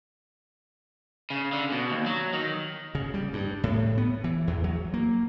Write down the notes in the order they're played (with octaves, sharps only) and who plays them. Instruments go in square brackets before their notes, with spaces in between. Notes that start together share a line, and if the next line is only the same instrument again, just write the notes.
[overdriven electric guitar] C#3
D3
B2
D#2
F#3
D#3
[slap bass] C#3
G3
G2
A2
B3
E3
E2
F#3
A#3